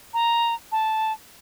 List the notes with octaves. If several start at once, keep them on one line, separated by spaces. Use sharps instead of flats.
A#5
A5